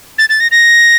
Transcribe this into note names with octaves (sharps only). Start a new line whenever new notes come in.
A6
A6
A#6
A#6